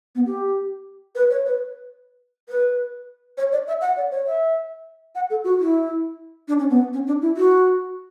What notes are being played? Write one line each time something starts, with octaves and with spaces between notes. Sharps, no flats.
B3
G4
B4
C#5
B4
B4
C#5
D5
E5
F#5
D5
C#5
E5
F#5
A4
F#4
E4
D4
C#4
B3
C#4
D4
E4
F#4